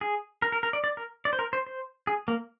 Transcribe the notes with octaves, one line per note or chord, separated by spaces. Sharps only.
G#4
A#4
A#4
A#4
D5
D5
A#4
D5
C5
A#4
C5
C5
G#4
A#3